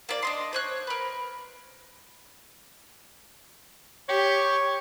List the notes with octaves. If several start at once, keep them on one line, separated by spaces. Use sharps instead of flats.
A#3 D5
D4 D#5 C6
C5 C#5 F#6
A#4 B4
G4 C#5